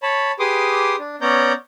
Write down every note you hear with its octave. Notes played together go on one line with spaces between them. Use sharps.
C#5 A5 B5
G4 G#4 B4 C6 D6 D#6
D4
B3 C#4 C#5 D5 A#5 G6